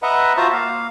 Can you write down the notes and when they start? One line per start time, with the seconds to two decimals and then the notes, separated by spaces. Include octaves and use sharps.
0.03 B4 D#5 E5 F#5 A#5
0.37 F4 F#4 C5 E5 A5 A#5
0.53 A#3 F5